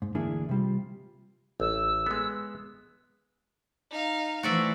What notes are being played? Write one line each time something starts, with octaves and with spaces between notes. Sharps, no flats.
G#2
D2 E3 A#3 D4 E4 G#4
C3 G3 F4
A1 E6
G#3 B3
D#4 F5
E3 A3 F#4 C5 D5 E5